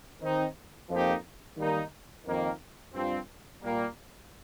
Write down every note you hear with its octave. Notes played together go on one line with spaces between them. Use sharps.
D#3 C4 D#4
F2 F3 A#3 D#4 G4
D#3 G3 A#3 D#4
F2 D#3 A#3
G2 F3 C4
A#2 G3 A#3